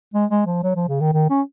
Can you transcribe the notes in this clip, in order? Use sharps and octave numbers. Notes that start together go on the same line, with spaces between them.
G#3
G#3
F3
F#3
F3
C#3
D#3
D#3
C#4